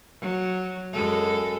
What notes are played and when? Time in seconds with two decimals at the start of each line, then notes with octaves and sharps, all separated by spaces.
0.21 F#3
0.93 F#2 G#3 A4